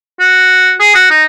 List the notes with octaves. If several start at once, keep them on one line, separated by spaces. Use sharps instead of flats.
F#4
G#4
F#4
D#4